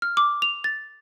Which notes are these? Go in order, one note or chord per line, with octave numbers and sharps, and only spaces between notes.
F6
D6
F7
A6